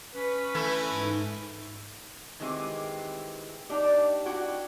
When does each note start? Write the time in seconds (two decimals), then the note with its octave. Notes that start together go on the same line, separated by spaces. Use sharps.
0.15 C#4 B4
0.55 E3 A3 E4
0.89 G#2 D#4
2.40 D#3 E3 G#3 C4 E4 G4
3.69 D4 D#4 G4
4.26 E4 F#4 G5